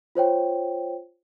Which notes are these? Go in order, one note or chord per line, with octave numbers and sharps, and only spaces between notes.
F4 C5 C#5 G5